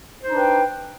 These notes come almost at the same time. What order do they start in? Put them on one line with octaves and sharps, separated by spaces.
C5 D#4 D4 B4 G5